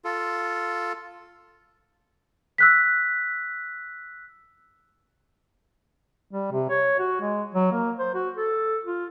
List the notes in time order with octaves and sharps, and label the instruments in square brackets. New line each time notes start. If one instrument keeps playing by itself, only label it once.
[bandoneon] F4 A4
[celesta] E6 F#6 B6
[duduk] G3
C3
C#5
F#4
G#3
F#3
A#3
C5
F#4
A4
F4